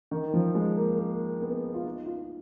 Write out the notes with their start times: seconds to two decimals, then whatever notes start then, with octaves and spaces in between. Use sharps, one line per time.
0.11 D#3
0.34 F3
0.55 G#3
0.77 A#3
0.98 A#3
1.42 B3
1.74 F4
1.85 D#4
2.06 F4